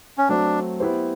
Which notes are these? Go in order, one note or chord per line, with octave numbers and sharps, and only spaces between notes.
C#4
F#3 A3 C4 D4
B3 E4 G4 C5